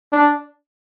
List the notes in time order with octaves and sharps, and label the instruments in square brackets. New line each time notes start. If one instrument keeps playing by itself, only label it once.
[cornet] D4